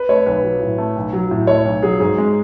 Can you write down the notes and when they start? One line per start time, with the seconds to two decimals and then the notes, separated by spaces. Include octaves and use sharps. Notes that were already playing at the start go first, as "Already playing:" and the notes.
Already playing: B4
0.09 A3 C#5
0.26 B1 B4
0.43 F#3
0.61 A2
0.78 A3
0.96 B1
1.13 F#3
1.31 A2
1.47 A3 C#5
1.65 B1
1.82 F#3 G#4
2.00 G#2 G#4
2.18 G#3